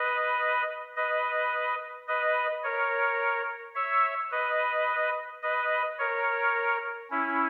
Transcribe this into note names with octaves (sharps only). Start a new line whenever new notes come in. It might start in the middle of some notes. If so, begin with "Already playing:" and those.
Already playing: B4 D#5
B4 D#5
B4 D#5
A#4 C#5
C#5 E5
B4 D#5
B4 D#5
A#4 C#5
C#4 E4